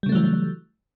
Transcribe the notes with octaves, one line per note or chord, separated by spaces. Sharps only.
C#3 E3 F#3 G3 A3